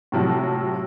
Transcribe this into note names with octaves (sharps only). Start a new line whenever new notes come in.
A2 C3 F3 F#3